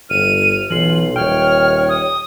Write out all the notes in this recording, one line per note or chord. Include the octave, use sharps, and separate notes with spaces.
G1 F6 D#7
B1 E3 F4 F#7
D#1 C#5 G5 F6
D#6